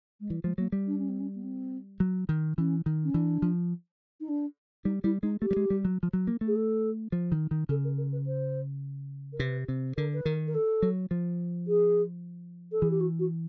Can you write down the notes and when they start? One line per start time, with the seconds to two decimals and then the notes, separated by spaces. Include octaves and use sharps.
0.20 G#3
0.30 E3 G3
0.44 F3 G#3
0.58 F#3 A#3
0.72 G3
0.87 D4
0.98 C#4
1.09 C4
1.20 C#4
1.35 B3
1.43 C4
2.00 F#3
2.29 D#3
2.58 E3 C#4
2.86 D#3
3.04 C#4
3.14 E3 D4
3.42 F3
4.20 D#4
4.28 D4
4.84 G3 D#4
5.04 G3 E4
5.23 G#3 D#4
5.42 A3 G4
5.51 G3
5.56 G#3
5.70 G3
5.85 F#3
6.03 F3
6.13 F#3
6.27 A#3
6.41 A3
6.47 G#4
6.56 A4
7.12 F3
7.32 D#3
7.51 D#3
7.69 C#3 A4
7.84 A#4
7.98 A#4
8.13 B4
8.26 C5
9.33 A#4
9.40 C3 B4
9.68 C3
9.97 D3 A#4
10.13 B4
10.25 D#3 A#4
10.47 A#4
10.54 A4
10.82 F#3
11.11 F3
11.67 G#4
12.72 A4
12.82 E3 G#4
12.90 G4
13.00 F#4
13.19 F#4